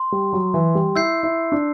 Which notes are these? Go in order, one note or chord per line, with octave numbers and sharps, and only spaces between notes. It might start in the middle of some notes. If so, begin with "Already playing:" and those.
Already playing: C6
G3
F#3
E3
G3
E4 E6 G6 C7
E4
D4